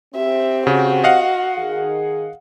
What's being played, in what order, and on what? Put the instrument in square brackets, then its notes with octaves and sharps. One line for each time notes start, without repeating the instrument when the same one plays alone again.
[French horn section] C4 G4 [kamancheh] E5
[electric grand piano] C#3 [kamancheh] F#4
[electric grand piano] D#5 F5 F#5
[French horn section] D#3 G#4